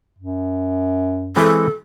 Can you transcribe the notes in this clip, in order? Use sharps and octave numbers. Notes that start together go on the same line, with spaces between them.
F#2
E3 G#3 C4 A4